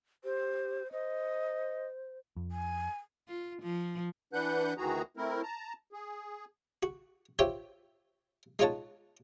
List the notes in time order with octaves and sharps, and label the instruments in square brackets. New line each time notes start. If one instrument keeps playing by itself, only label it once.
[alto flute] G4 [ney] C5
[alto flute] C5 [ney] D#5
[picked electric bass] F2
[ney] G#5
[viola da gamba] F4
F3
[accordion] E3 D4 B4 F#5 F#6 G6
D2 D#3 E3 F#4 G#4 A#5
A3 C4 E4 A#4
A5 A#5
G#4
[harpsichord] F#4
F4 G4 C5 C#5 E5 G5
G#3 D#4 F4 C#5 F#5 A5